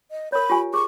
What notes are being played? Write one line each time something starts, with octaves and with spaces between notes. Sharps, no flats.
D#5
A#4 C#5 B5
F4 G4 G#5
G#4 C#6